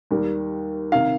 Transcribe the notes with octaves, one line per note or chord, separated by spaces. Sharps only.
D#2 D#3 G3
C3 D#3 F5